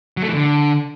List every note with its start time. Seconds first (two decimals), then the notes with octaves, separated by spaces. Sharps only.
0.17 F#3
0.22 A3
0.28 E3
0.33 D3